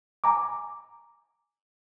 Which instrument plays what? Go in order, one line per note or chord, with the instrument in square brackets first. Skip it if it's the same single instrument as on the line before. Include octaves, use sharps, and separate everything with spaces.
[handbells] G#5 A#5 D6